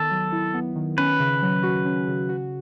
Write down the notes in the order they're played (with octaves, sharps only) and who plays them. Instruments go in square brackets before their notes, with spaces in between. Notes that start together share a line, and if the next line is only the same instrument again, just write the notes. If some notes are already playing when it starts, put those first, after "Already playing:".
Already playing: [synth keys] D#3 B3 [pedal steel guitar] A4
[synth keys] F#3
E4
B3
D#3
[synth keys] C#4 [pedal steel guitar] B4
[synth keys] C#3
F#3
F#4
C#4
C#3
F#4